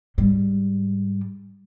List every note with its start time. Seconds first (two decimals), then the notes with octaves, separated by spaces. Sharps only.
0.18 G#2 G3